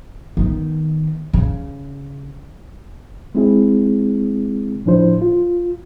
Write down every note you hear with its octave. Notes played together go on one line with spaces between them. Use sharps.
D#3 B3
C#3
G#3 C4 E4 G#4
A2 F3 D4 E4 C5
F4